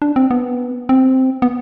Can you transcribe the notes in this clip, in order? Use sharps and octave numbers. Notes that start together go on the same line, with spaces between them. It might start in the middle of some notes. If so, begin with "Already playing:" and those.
D4
C4
B3
C4
B3